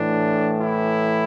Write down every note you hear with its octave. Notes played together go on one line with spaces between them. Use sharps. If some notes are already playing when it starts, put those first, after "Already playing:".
Already playing: A2 E3 D4
E4